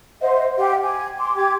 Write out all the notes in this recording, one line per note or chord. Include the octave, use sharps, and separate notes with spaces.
C5 D#5 E5 F#5
G4 F5 F#5
G#5 D6
C6 D6
G4 G5 D6 G#6